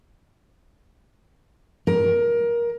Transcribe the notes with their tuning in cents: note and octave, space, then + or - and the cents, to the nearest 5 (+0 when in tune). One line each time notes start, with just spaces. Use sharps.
A#4 +20